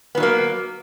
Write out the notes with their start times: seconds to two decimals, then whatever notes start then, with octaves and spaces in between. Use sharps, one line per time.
0.15 B3
0.17 F3
0.20 F#3
0.23 A#3